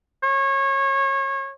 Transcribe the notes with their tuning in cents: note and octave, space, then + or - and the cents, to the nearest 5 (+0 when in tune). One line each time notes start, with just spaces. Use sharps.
C#5 -25